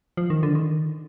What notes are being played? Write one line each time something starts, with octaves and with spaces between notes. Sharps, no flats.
F3
D#3
D3
D#3